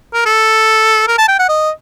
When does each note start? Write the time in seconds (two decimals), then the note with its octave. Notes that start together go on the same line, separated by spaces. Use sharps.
0.13 A#4
0.25 A4
1.08 A#4
1.18 A5
1.28 G5
1.39 F#5
1.48 D#5